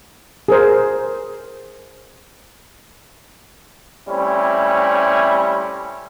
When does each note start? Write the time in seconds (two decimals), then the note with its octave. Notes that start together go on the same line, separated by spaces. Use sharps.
0.48 G#4 A#4 C5
4.08 G3 A3 C4 C#4 E4